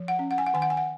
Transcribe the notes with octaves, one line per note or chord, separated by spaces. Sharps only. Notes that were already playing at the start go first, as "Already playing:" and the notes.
Already playing: F3
F#5
C#4
F#5
G#5
F#5
D#3 G#5
F#5
G#5
F#5